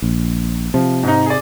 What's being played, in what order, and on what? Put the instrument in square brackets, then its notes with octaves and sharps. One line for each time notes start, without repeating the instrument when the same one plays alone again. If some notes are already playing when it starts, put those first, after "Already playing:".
[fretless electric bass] A#1
[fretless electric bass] C3 [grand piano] F3
[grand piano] G#2 D#4
G#4 D5